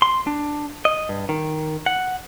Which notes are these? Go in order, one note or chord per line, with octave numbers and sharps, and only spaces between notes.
C6
D4
D#5
G2
D#3
F#5